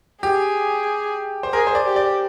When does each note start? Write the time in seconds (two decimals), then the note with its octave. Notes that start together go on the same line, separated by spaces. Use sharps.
0.22 G4 G#4
1.43 C5
1.53 G#4 A#4
1.67 C5
1.75 D5
1.86 G4
1.96 D5